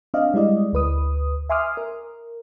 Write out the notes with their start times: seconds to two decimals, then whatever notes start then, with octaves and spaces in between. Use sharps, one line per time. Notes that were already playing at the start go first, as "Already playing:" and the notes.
0.14 C4 D4 D5 D#5 F5
0.34 G3 G#3 E4 D5 D#5
0.73 D2 B4 D#6
1.49 E5 G#5 C6 D6 D#6 F6
1.77 A#4